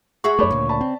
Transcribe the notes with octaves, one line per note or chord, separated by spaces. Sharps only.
F#4 G#4 E5 C#6
F#2 A3 C#5 B5 D6
D2 A#2 C#3
D5 A5 B5
C4